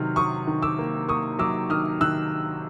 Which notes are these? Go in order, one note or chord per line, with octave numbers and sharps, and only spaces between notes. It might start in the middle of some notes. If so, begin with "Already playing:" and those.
Already playing: C3 D#3 F#3 F6
F#3 C#6 D#6
D#3
D6 E6
A#3
A#3 C#6 D#6
F#3 D6 E6
D#3 D#6 F6
D#3 E6 F#6